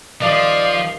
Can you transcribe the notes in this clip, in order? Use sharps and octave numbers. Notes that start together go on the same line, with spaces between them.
D#1 F3 D5 D#5 F5 E7